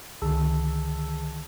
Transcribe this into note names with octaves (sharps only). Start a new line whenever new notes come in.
C#2 D3 D#3 G#4 A5 E6